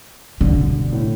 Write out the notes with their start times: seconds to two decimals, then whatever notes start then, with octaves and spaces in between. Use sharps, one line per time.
0.41 G2 B2 D3
0.92 A2